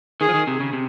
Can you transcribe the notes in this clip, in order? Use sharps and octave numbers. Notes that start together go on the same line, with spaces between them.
D#3 G#4
F3
D#3
C3
C#3
C3